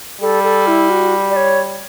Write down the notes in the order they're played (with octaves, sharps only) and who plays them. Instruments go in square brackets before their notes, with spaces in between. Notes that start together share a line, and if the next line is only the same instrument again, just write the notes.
[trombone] G3 [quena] A4
[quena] A4
E4
F#4
D5
C#5